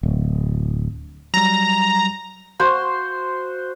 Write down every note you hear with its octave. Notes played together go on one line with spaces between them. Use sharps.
D1
F#3 G3 A#5
F#4 C5